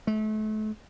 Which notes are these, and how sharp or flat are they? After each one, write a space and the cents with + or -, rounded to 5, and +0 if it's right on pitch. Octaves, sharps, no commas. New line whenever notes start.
A3 -35